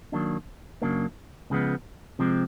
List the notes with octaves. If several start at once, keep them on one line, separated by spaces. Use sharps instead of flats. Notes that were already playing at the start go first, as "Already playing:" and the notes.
D#3 F#3 A#3 D4
F#2 C#3 F#3 A#3 D4
C#2 C#3 F3 G#3 B3
C3 F3 G#3 C4